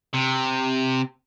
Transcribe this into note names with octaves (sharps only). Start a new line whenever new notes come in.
C3